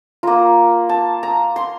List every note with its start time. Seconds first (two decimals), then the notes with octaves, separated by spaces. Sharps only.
0.23 A#3 F4 A#5
0.89 A5
1.23 A#5
1.56 C6